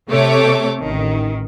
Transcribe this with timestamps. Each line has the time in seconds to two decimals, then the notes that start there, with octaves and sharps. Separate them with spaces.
0.11 C3 A3 A4 C#5 D6
0.82 A1 D#3